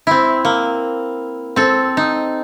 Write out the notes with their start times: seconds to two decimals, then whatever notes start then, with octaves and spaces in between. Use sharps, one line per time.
0.07 C4 E4
0.45 A#3
1.56 C4 A4
1.97 D#4